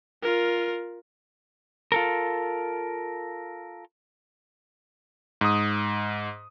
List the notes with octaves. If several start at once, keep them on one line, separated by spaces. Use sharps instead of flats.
F4 A#4
F4 A4 A#4
G#2 D#6